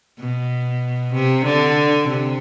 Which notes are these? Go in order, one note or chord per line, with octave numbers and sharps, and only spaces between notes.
B2
C3
D3
C3